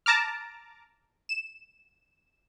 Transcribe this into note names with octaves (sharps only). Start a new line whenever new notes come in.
A5 A#5 D6 F6
E7